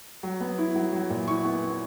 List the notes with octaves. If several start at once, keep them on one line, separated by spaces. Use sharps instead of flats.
F#3
B3
E4
F#3
F#3
A#2
E4 C#6
B3
B3